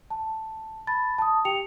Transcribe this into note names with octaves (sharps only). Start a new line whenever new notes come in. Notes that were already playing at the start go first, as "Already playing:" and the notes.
A5
A5 B5 A6
A5 D#6
G4 G5 C#7 F7